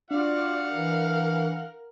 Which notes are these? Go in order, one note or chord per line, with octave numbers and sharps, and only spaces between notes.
D4 F4 F#4 D5 F5 F#5 F6
E3 A#4